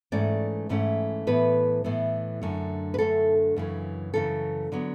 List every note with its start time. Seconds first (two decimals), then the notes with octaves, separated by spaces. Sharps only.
0.12 G#2 E3 A3 C#4 D5
0.69 G#2 E3 A3 C#4
1.27 A2 E3 B3 B4
1.84 A2 E3 B3
2.42 F#2 D3 A3
2.94 B4
2.98 F#2 D3 A3 A4
3.56 F#2 C#3 E3
4.14 F#2 C#3 E3 A4
4.72 D3 F#3 B3